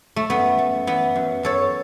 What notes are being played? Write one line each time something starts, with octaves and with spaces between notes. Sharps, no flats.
A3
F#2 B3
A3
E3 B3
F#2
F#2 A4 C#5